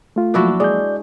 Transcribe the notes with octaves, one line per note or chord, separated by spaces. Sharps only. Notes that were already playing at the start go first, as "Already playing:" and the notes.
A3 F4
F3 F#3 A#3 D4 E4 F#4
G#3 D5 G6